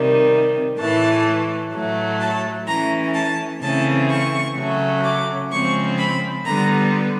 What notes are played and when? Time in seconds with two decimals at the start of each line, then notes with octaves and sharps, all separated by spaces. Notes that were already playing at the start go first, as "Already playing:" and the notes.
Already playing: C3 D#3 G3
0.78 A2 E3 A3 A5
1.73 A2 F#3 A3
2.20 A5
2.67 E3 A3 C#4 A#5
3.15 A5
3.61 C#3 E3 A3 C4 A5
4.10 C#6
4.57 C#3 F#3 A3
5.04 D6
5.51 C#3 F3 G#3 C4 C#6
5.98 B5
6.45 D3 G3 B3 A#5